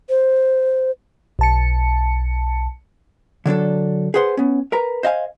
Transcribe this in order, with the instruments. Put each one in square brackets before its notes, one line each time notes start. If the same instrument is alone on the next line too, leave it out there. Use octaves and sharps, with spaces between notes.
[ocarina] C5
[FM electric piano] B1 A5 C#7
[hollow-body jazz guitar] D3 F#3 D4 A4
G#4 B4 C5 F#5 C6
B3 C#4
A#4 B4 A#5
C5 D#5 F5 G#5